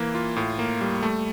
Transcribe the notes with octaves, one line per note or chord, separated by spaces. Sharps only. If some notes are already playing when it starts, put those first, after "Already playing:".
Already playing: E3 A#3
F4
A2
A#3
G3
A3